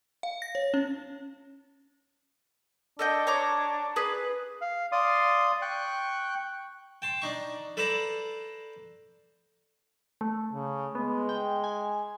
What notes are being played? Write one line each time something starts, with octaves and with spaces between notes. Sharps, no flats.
F5
A#6
C#5
C#4
D4 A4 D#5 G5
C#5 A#5 D6
G#4 B4
F5
D5 F5 C6 D#6
G5 C#6 F#6
G5 A5 C6
D4 D#4 C#6
A4 B4 C5 D5 A5 A#5
A3
C#3
G#3 B3
G5
G#5